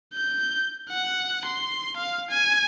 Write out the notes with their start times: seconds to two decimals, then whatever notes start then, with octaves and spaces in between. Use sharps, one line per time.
0.14 G6
0.90 F#5
1.46 C6
1.97 F5
2.30 G#5